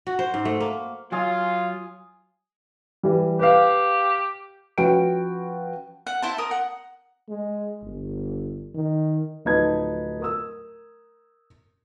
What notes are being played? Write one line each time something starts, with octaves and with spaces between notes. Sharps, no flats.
F#4
C5
G#2
A3
A#3
F#3 F4 G#5 D#6
E3 G3
G4 B4 F5
F3 C#4 F#4 B4 G5 D7
F#5
E4 C5 A5
A#4 D#6
F#5
G#3
G1
D#3
D1 F3 D#4 B4 A5 G#6
A#4 D#6 E6